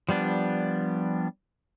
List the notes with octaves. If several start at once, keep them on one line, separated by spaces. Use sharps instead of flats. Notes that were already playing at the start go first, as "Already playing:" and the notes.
F3 G3 B3 D4